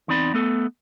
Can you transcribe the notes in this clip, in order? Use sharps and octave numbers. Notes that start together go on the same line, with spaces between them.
E2 C4 D#4 D5 B5
A3 B3 A4